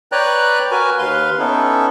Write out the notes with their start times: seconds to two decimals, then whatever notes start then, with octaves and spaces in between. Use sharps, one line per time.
0.12 B4 C#5 D5 G5 A#5 F#6
0.71 F#4 A#4 B4 G#5
0.99 D#2 B4 F5 C6
1.39 B3 C#4 D#4 E4 A4